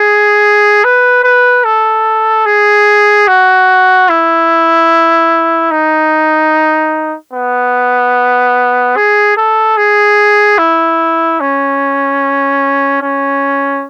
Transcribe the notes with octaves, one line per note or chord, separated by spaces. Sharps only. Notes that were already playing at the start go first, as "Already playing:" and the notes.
Already playing: G#4
B4
B4
A4
G#4
F#4
E4
D#4
B3
G#4
A4
G#4
E4
C#4
C#4